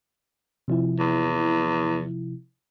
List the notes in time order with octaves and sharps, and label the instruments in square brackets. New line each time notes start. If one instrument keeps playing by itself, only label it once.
[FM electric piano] C3 F3 E4
[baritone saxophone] E2